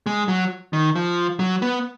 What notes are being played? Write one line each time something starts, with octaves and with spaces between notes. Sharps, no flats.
G#3
F#3
D#3
F3
F#3
B3